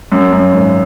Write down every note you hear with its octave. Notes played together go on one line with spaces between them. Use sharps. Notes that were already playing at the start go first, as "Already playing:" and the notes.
F#2
F#2
G#1